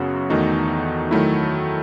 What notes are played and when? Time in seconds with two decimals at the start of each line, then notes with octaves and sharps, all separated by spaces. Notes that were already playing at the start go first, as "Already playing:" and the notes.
Already playing: F#2 C#3 F#3 B3 F#4
0.30 E2 D#3 A3 D#4 F#4
1.11 D#3 F#3 A3 E4